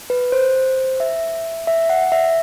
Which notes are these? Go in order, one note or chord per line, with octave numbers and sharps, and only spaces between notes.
B4
C5
E5
E5
F#5
E5